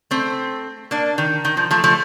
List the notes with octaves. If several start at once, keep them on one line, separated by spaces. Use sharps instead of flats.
A3 C4
A#3 D4
D#3
D#3
F3
F3 A3
F3 A3